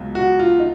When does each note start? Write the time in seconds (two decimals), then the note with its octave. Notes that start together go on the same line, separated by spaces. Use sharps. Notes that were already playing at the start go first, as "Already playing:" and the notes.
Already playing: C#2 B2 F#3
0.15 F#4
0.39 F4
0.60 D#4